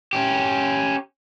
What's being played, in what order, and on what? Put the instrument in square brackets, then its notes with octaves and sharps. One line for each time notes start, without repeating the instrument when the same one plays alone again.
[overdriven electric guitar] C#4 G4